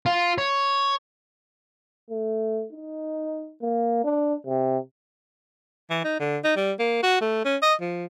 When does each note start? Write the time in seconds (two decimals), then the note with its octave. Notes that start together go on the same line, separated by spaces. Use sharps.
0.06 F4
0.38 C#5
2.10 A3
2.72 D#4
3.62 A#3
4.04 D4
4.46 C3
5.90 E3
6.04 D#4
6.20 D3
6.44 D#4
6.56 G3
6.79 A#3
7.03 F#4
7.21 A3
7.45 C#4
7.62 D#5
7.81 F3